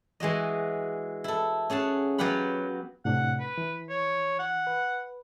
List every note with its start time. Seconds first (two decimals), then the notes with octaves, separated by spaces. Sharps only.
0.20 E3 G#3 F#4 D#5
1.24 E4 A4
1.70 C#4 G#4 F#5 A5
2.18 F#3 B3 G4 F5 F#5 B5
3.05 A2 C3 D4 F#5
3.40 B4
3.58 E3
3.89 C#5
4.39 F#5
4.67 B4